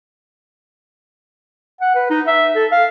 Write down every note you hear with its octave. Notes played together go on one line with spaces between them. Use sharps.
F#5
B4
D#4
E5
A4
F5